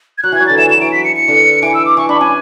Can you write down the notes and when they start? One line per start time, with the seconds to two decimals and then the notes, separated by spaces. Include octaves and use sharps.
0.18 G#6
0.23 F#3 F#6
0.32 E3 G#6
0.40 F#3
0.46 D3 A6
0.58 E3 E7
0.69 F#3 E7
0.81 E3 D7
0.92 B6
1.04 C#7
1.16 C#7
1.28 D3
1.62 E3 D7
1.74 E6
1.85 D6
1.97 E3 C#6
2.09 D4 B5
2.20 C#4 G#5